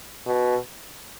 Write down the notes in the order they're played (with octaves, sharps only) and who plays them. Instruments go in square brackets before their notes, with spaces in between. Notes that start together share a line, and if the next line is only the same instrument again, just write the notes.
[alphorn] B2